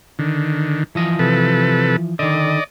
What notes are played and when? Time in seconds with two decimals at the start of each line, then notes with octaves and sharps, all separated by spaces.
0.19 D3 D#3
0.95 E3 F3 D#5
1.19 C3 A4 B4
2.19 D3 D#3 D5 D#5